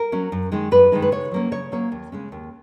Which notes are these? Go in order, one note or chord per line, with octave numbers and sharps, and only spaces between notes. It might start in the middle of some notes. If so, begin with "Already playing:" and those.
Already playing: A#4
F#3 C#4
F#2
D#3 G#3 D#4
F#2 B4
D#3 G#3 D#4
B4
C#3 C#5
F#3 A#3 C#4
C#3 C#5
F#3 A#3 C#4 C#5
D#2
C#3 G#3 C#4
D#2